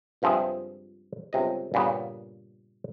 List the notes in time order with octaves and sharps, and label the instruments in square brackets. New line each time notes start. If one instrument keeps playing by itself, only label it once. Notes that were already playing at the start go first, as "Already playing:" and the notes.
[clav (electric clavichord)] C#2 G2 F3 C4 G#4 E5
G1 C#2 C3 D#5
G2 A#2 C#3 B3